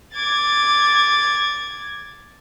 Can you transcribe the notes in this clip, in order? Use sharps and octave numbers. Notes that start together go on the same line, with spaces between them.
D6 G#6 A6